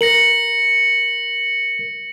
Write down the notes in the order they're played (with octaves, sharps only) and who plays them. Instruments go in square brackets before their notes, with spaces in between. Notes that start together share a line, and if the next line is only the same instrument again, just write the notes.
[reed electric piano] A#4 [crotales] A#6 C#7 F#7